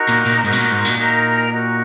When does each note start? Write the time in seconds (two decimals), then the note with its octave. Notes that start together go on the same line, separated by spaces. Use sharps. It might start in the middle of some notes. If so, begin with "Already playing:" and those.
Already playing: D#4 F#4 A#4
0.09 A#2
0.26 A#2
0.44 G#2 D#4 F#4 A#4
0.52 B2
0.58 A#2
0.72 G#2
0.85 A#2
0.98 D#4 F#4 A#4
1.52 D#4 F#4 A#4